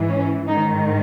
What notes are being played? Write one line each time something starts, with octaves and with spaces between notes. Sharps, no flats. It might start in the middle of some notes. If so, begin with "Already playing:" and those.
Already playing: G#2 E3
C#4
G#2 D#3 D#4